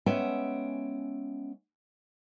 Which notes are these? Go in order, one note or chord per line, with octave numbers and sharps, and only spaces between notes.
G#3 B3 C#4 E5 F#5 G5